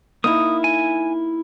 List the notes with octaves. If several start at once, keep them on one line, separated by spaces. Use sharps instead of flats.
A#3 D#4 E4 D#6
G#5